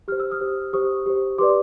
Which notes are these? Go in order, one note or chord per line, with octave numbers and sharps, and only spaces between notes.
G4 C5 F6
E6
D#6 F6
G4 C5
G4 C5 C#6 D#6
G4 C5
G4 B4 D5 C6 D6